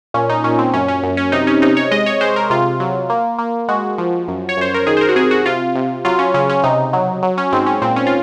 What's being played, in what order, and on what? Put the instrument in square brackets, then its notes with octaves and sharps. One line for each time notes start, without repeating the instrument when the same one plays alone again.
[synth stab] A#2 C#4
D#4
A#2 C#4
C4
F#2 C#4
C#4
F#2
C#4
C3 D#4
C#4
C3 D#4
C#5
G#3 D#5
C#5
G#3 C5
A#4
C3 F4
F#3
A#3
A#3
G#3 F#4
F3
F#2
C#5
F#2 C5
A#4
D#3 G#4
C5
A#4
F#4
C3 G#4
F#4
C3 F4
C3
F#3 F4
C#4
C#3 C#4
C#4
C3 D#4
F#3
F#3
C#4
G#2 C4
C#4
A#2 C4
C#4
F4